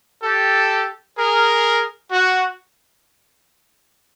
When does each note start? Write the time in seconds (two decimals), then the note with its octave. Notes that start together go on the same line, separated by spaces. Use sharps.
0.22 G4 A4
1.18 G#4 A#4
2.12 F#4